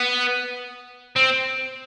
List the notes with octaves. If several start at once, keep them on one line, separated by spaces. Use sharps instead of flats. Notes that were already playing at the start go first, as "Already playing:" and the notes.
Already playing: B3
C4